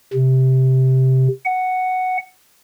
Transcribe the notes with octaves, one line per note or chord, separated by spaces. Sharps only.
C3
F#5